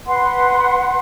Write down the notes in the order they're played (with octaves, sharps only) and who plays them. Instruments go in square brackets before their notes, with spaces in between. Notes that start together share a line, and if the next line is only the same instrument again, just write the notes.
[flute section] B4 F#5 C6